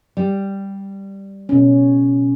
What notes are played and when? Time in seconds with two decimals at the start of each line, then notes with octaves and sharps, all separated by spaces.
0.17 G3
1.49 B2 C#4